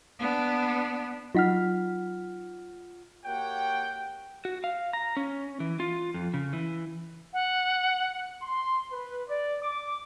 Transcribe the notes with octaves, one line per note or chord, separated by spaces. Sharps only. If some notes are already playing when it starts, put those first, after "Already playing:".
B3 D4
F#3 D#4 F4 F#5 F6 B6
A#3 F#4 G4 C#5 F#5 G5
F#4
F5
A#5
C#4
E3
F4
F2
C#3
E3
F#5
C6
B4
D5
D6